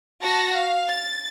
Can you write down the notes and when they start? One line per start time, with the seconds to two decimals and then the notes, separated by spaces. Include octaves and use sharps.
0.23 F#4 A5 A#6
0.54 F5
0.87 A6